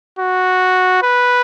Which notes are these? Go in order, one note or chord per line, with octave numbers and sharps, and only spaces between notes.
F#4
B4